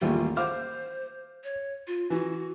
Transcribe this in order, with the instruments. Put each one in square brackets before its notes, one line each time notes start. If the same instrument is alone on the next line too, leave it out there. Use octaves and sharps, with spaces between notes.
[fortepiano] A1 D#2 G3 [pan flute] F4
[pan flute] C5 [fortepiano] F5 D6 F6
[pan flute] C#5
F4
[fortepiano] E3 [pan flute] F#4